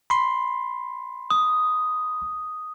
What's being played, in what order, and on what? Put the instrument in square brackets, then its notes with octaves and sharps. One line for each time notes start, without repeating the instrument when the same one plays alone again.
[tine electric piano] B5 C6
[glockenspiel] D#6